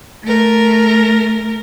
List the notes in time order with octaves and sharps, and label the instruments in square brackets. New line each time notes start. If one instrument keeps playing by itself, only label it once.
[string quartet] A3 A#4